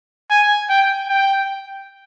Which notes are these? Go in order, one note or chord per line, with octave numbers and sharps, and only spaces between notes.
G#5
G5
G5